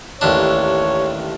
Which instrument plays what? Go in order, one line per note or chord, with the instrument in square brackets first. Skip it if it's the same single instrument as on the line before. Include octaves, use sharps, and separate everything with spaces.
[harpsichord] A1 D#2 D4 [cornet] C#5